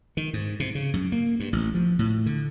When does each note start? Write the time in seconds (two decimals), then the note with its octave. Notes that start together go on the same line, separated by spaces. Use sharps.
0.17 D#3
0.34 G#2
0.60 C3
0.75 C#3
0.94 F#2
1.12 A#3
1.40 G2
1.53 A1
1.74 F3
1.99 A2
2.26 D3